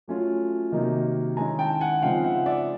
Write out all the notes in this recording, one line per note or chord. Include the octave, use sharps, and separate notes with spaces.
F#3 A3 C#4 F4
C3 D#3 F#3 A#3 D#4
D#3 G#3 C#4 E4 G#5 A#5
G5 A5
F#5 G#5
C#3 F3 G#3 C4 D#4 F5 G5
E5 F#5
D5 E5